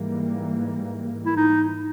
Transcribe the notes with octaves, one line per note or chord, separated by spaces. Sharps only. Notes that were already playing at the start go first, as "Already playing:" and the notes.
Already playing: G#2 E3 G3 A#3
E4
D#4